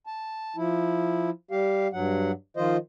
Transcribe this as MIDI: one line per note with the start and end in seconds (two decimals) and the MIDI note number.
0.07 0.56 81
0.56 1.30 53
0.56 1.30 64
1.51 1.88 55
1.51 1.88 67
1.51 1.88 77
1.93 2.32 43
1.93 2.32 54
1.93 2.32 78
2.57 2.77 51
2.57 2.77 53
2.57 2.77 65
2.57 2.77 72
2.57 2.77 75